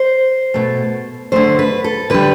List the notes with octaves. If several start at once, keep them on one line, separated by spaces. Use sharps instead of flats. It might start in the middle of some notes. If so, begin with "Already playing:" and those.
Already playing: C5
B2 A3
D3 A3 C5
B4
A4
D3 G3 B4